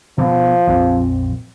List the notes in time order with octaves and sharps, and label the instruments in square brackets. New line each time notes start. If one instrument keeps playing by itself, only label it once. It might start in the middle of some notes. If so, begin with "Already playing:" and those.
[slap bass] B2 [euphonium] F3
[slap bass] A#1 F2 C4